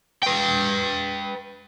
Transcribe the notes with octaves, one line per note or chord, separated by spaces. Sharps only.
B4 G5